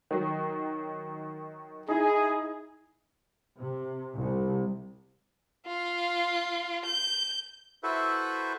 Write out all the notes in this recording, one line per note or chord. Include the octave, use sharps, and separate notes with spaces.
D#3 F#3
D#4 E4 G#4
C3
C2
F4
G6
E4 F#4 A4 B4 C5 E5